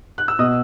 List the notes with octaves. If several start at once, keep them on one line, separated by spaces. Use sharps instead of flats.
F#6
E6
B2 D#5 D#6